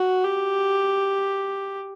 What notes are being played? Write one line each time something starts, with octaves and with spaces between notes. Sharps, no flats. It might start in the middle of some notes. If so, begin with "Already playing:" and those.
Already playing: F#4
G4